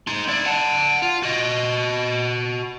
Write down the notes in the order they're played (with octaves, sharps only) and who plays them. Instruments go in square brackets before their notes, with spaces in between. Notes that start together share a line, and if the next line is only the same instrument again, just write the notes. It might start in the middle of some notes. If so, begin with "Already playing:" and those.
[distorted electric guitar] D#4 C6
E4 D5
F#5 A5
F4
F#4 D#5